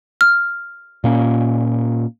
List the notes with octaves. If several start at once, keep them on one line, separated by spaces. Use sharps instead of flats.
F6
A#2 A#3 C#4